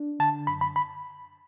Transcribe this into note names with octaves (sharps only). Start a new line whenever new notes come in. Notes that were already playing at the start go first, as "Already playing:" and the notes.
Already playing: D4
D3 A5
F#2 B5
B5
B5